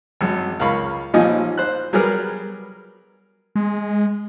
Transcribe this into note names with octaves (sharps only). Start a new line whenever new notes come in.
G#1 F#2
C#2 A#4 F5 B5 C#6
A1 A#2 F3 D#4 D#5 G#5
C5 F#6
F#3 G3 B3 G#4 A#4
G#3